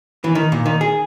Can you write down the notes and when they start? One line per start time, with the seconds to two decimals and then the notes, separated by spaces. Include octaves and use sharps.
0.24 E3
0.35 D#3
0.52 A#2
0.66 D#3
0.81 G#4